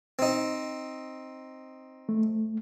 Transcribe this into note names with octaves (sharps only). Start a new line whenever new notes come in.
C4 D#4
A3